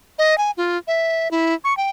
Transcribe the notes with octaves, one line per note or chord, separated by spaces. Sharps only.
D#5
G#5
F4
E5
E4
C#6
G5